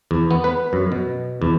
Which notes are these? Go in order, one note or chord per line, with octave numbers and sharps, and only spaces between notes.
E2
B3
B4
F#2
B2
E2